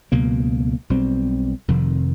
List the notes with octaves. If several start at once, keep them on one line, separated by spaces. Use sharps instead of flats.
C#2 B2 F#3 A#3
B1 B2 G3 C4
F1 F2 C3 D#3